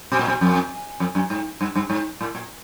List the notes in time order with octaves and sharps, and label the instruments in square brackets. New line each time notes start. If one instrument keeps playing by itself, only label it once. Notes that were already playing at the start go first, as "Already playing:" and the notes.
[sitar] B2
A#2
B2
F2
F2
F#2
G#2
G2
G2
G#2
A2
A#2